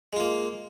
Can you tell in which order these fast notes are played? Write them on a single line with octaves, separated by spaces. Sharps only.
G#3 F4 A#3